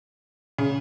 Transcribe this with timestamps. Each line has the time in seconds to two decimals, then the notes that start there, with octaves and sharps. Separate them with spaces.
0.58 C#3